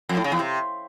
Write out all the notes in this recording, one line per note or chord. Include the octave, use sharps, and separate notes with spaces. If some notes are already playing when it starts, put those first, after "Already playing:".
F2
A2
C#3
E2
C3